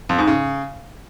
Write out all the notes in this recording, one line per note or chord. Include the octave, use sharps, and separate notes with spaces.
F2
G#2
C#3